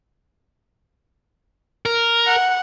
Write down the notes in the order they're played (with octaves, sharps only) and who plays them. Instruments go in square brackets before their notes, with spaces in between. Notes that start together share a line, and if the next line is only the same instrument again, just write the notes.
[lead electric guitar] A#4
[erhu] F#5